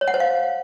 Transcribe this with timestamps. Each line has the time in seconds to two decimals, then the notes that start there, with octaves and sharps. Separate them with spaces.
0.01 C#5
0.08 F#5
0.14 C5
0.20 F5